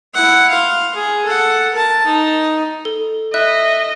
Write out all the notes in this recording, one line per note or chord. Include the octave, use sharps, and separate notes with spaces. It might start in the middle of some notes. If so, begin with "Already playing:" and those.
E4 F#5
F5 C6
G#4
A4 F#5
A#4 A5
D#4
A4
D#5 E5 F#6